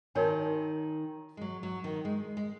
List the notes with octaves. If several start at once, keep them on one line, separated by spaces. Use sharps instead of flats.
D#3 D#4 F#4 A#4 C#5 G#5
G#3
F#3
F#3
D#3
G#3
G#3